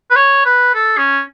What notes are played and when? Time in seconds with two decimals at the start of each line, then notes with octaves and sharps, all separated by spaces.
0.10 B4
0.16 C#5
0.46 B4
0.75 A4
0.98 C#4